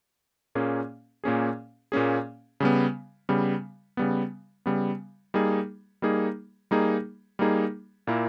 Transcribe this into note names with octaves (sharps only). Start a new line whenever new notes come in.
A#2 A#3 C#4 G#4
A#2 A#3 C#4 G#4
A#2 A#3 C#4 G#4
C#3 G3 B3
C#3 G3 B3
C#3 G3 B3
C#3 G3 B3
G3 A#3 D#4 G#4
G3 A#3 D#4 G#4
G3 A#3 D#4 G#4
G3 A#3 D#4 G#4
A#2 A#3 E4 A#4